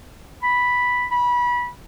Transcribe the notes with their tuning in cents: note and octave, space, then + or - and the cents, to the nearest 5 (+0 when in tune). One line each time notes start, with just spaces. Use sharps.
B5 -5
B5 -20